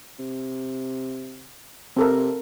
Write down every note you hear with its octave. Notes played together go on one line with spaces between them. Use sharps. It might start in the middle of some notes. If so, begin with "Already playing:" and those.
C3
C3 C4 A4 A#4